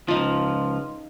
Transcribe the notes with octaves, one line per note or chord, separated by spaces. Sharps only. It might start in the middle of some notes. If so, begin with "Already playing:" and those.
C#2 F3 D#4 F4